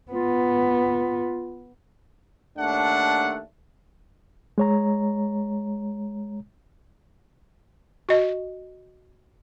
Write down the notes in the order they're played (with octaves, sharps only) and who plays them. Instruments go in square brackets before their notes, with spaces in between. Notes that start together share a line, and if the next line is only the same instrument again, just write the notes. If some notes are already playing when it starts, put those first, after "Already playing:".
[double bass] B3 [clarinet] F4
[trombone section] D#2 A3 D4 [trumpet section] F#5
[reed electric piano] G#3 C#5 A#5
[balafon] F#4 D#5